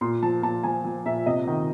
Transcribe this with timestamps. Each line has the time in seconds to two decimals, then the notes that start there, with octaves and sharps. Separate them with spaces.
0.01 A#2 C6
0.23 F3 A5
0.43 A#2 A5
0.63 F3 G#5
0.84 F3
1.05 A#2 E5
1.26 C3 D#5
1.47 D#3